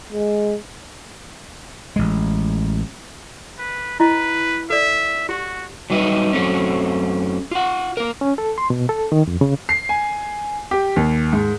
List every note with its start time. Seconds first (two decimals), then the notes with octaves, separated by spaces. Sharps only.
0.13 G#3
1.96 A1 G#3
3.58 B4
4.00 E4 B4 D#5
4.70 A4 D5 E5
5.29 F#4 G4
5.90 F#3 G3 D#4 B4 E5
6.33 F#2 F#3 A3 C4 C#4
7.51 F4 F#5
7.97 A#3 A#4
8.21 C#4
8.38 A4
8.58 C6
8.70 B2
8.89 A4
9.12 D#3
9.27 F2
9.41 C#3
9.69 C7
9.89 G#5
10.71 G4
10.96 D#2
11.33 G#2